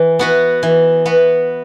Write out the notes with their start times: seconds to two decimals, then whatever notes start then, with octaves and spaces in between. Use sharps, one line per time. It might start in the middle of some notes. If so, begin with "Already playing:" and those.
Already playing: E3
0.19 B3 F#4 B4
0.63 E3
1.06 B3 F#4 B4